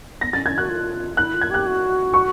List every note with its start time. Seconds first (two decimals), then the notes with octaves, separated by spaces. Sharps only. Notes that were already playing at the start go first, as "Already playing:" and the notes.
0.21 B3 A#6
0.33 C#4 A6
0.46 C#4 G#6
0.57 F#4 F#6
0.69 F4
1.17 E4 F#6
1.34 F4
1.41 G#6
1.50 G4 F#6
1.66 F#4
2.14 C#6